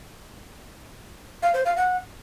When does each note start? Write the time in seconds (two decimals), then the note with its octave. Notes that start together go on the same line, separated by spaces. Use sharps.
1.43 F5
1.54 C5
1.65 F5
1.76 F#5